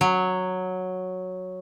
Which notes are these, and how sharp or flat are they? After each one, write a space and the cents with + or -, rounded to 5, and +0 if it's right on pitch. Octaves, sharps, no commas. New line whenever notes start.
F#3 -5